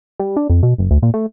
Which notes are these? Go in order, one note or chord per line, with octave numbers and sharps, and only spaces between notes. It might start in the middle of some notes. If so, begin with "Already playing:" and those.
G3
D4
F2
B2
F#1
D2
A#2
A3